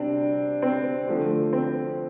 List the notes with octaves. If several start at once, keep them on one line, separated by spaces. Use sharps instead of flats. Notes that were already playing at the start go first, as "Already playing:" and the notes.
Already playing: C3 G3 C4 D4
C4
D3 F3 A3
C4